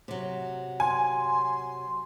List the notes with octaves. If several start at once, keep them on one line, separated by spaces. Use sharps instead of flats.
C3 F#3
G#5 C6